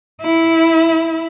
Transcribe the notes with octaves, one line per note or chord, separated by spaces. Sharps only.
E4